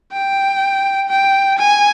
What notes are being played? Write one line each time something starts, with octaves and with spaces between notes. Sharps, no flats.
G5
G5
G#5